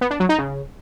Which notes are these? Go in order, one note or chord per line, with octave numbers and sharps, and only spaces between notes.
B3
D4
F#3
D#4
C#3